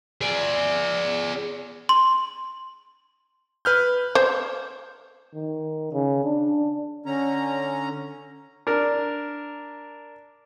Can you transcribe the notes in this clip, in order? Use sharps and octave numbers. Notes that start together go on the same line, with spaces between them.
G#4 D5
C6
B4 F6 G6
C5
D#3
C#3
D4
D3 C#4 A#5
D4 A#4